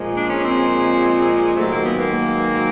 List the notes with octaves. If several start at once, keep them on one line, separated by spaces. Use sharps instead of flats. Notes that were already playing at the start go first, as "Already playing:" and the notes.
Already playing: A#2 F3 G#3
D4
C#4
C4
G#2 D#3 F#3 A3
A#3
B3
A#3